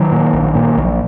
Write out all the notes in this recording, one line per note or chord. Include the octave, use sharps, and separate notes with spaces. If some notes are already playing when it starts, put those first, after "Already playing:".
Already playing: D#3 F#3
A#2
A#1
A#2
A#1